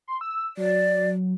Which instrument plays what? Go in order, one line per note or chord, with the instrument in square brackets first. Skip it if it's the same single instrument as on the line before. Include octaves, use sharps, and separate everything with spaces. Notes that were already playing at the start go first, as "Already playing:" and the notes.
[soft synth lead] C6
E6
[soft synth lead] F#3 [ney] D5